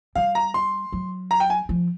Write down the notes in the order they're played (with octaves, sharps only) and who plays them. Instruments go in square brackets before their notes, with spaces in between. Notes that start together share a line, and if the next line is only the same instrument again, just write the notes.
[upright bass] G3 [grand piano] F5
[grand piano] A#5
C6
[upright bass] F#3
[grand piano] A#5
G5
G#5
[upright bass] F3